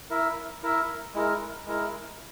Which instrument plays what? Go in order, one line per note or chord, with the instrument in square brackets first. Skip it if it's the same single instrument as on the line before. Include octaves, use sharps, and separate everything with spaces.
[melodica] E4 A#4 E5
E4 A#4 E5
G#3 E4 A#4
G#3 E4 A#4